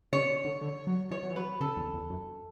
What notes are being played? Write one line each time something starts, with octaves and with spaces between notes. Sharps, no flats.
C#3 C#5
D3
D3
F#3
E3 C#5
F#3
E3
F#3 B4
C#3 A4
E2
E2
F#2